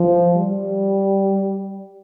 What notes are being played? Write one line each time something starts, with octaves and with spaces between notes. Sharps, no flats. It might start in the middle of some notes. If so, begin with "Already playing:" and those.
Already playing: F3
G3